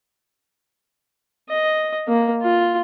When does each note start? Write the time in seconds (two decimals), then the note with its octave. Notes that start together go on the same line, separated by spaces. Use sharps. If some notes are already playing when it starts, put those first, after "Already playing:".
1.49 D#5
2.07 A#3
2.42 F4